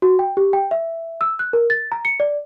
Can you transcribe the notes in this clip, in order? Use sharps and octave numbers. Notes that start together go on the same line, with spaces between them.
F#4
G5
G4
G5
E5
E6
F#6
A#4
A6
A#5
C#7
D5